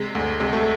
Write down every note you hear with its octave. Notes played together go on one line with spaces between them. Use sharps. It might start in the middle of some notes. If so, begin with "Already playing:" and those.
Already playing: C3 G#3
D2
C3 G#3
A3